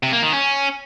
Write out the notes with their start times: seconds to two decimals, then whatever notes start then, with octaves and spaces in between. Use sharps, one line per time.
0.03 C3
0.13 A#3
0.23 D#3
0.32 C#4